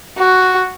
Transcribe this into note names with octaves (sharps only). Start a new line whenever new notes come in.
F#4